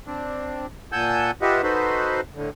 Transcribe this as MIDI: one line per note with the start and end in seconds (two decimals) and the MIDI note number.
0.07 0.66 60
0.07 0.66 62
0.92 1.31 46
0.92 1.31 78
0.92 1.31 80
0.92 1.31 81
0.92 1.31 88
0.92 1.31 91
1.42 1.62 65
1.42 1.62 67
1.42 1.62 71
1.42 1.62 75
1.42 1.62 76
1.42 1.62 78
1.63 2.21 63
1.63 2.21 66
1.63 2.21 69
1.63 2.21 71
1.63 2.21 72
2.35 2.50 45
2.35 2.50 50